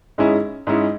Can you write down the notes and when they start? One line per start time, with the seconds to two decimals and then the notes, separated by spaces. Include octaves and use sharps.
0.18 G#2 G#3 C#4 E4
0.67 G#2 G#3 C#4 E4